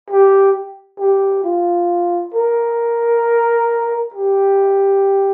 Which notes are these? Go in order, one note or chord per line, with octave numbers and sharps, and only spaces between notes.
G4
G4
F4
A#4
G4